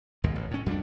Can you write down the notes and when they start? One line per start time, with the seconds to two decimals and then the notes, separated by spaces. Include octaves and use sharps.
0.24 G#1 D#2 B2 G#3
0.36 A1
0.51 A2 C#4
0.66 F2 G3 B3 D4